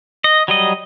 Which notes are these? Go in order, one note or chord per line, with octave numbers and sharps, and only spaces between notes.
D#5
F#3 G3 D#5